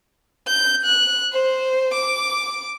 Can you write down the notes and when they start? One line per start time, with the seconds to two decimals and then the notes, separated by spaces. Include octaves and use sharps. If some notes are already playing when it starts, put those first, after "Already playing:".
0.47 G6
0.85 F#6
1.32 C5
1.94 D6